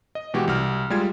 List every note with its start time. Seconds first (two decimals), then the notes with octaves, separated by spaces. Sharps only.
0.15 D#5
0.34 B2 E3 G#3 F#4 G4
0.48 C2 F6
0.90 G3 G#3 F4 G#6